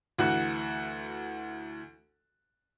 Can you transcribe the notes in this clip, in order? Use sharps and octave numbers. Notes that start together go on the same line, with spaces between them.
D2 E3 F#4 F#6